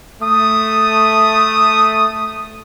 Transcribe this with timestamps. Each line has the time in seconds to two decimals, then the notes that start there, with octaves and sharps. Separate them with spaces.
0.22 A3 D#6